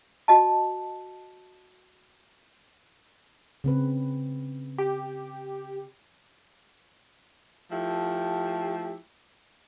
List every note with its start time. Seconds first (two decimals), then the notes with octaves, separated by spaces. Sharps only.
0.28 F#4 D#5 A5
3.64 C#3 C4 B4
4.78 G4
7.70 F3 A3 E4 G4